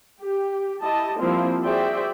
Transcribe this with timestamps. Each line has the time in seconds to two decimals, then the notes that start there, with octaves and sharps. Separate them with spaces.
0.21 G4
0.81 E4 G4 D#5 A5
1.19 F3 G3 A#3 C4 E4 F4
1.63 F#4 G#4 C5 D5 E5 G5